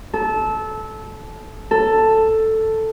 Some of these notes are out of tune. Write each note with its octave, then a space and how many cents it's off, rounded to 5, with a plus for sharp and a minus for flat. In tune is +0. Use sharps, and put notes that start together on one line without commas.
A4 -20
A4 +5